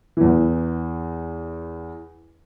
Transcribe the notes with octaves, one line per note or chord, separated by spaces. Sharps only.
E2 E3